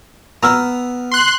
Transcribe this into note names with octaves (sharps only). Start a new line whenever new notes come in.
B3 A#5 E6 F6
C6 F#6